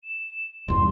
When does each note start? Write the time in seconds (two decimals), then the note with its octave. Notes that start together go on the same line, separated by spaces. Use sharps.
0.04 E7
0.68 D#1 E2 G2 C6